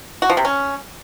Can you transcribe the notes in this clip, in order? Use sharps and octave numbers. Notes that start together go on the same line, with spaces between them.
F#4
F3
C3
C#4